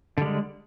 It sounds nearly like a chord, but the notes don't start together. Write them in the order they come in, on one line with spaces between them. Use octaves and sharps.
D3 G3 G#3